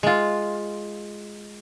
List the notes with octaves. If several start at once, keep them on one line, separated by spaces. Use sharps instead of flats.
G#3 F4